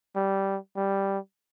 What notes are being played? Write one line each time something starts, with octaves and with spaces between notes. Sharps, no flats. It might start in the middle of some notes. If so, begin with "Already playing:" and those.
G3
G3